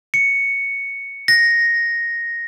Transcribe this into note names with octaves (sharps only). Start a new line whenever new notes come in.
C#7
A#6